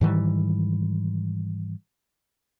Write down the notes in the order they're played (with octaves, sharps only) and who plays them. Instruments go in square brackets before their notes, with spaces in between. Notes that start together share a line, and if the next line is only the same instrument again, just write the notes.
[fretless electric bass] G#2 D#3 E3 G3